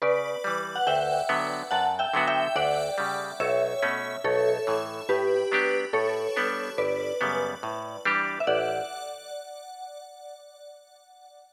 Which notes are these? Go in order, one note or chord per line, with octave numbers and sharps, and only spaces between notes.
C#3 B4 D5
E3 G3
F#5
D2 E5 G5
D3 F#3 B3
F#2 F#5 A5
E5 G5
D3 F#3 B3 F#4
E5 G5
D2 D5 F#5
C#3 G3
B1 C#5 E5
B2 A3 C#4
B1 A4 C#5
A2 E3
A2 G4 B4
F#3 B3 D4 G4
A2 A4 C#5
G3 B3 D4
G1 B4 D5
F#2 C#3 G3 B3
A2
E3 G3 D4 G4
E5
A1 D5 F#5